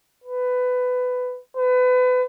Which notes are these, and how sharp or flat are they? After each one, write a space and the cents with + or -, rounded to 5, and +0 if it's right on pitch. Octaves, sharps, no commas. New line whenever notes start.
B4 +15
B4 +30